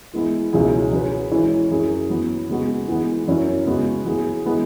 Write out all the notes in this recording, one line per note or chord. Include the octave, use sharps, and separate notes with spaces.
E3 G#3 B3 E4
C#2 B2 F#3 E4 G#4
F#3 C#4 G#4 B4
E3 G#3 C#4 E4 C#5
F#2 F#3 E4 G#4
F#3 B3 E4
C#3 G#3 B3 F#4
E3 G#3 B3
F#2 F#3 C#4 E4
C#3 G#3 B3 F#4
F#3 B3 E4 G#4
E3 G#3 B3 E4